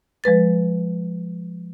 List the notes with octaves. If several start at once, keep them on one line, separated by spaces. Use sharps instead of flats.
F3 G#3 B4 A6